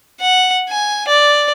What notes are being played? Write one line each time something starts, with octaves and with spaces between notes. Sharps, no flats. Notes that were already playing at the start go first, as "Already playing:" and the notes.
F#5
G#5
D5